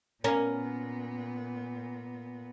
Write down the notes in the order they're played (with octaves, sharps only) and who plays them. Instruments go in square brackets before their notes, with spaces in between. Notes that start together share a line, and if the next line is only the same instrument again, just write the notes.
[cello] A#2 B3 [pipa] A#3 A#4 [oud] C#4